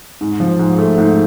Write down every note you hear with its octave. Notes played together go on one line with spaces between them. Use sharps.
G#2
F3
G#2
A3
G#2